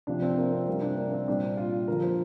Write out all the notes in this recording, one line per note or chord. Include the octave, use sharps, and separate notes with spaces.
C3 F3 D4
C4
A#3
C4
C3 G3 A#3
D4
A#3
C4
A#2 G3 D4
F4
D3 F3 A#4
C5